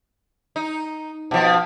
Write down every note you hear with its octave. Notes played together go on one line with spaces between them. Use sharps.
D#4
B2 F3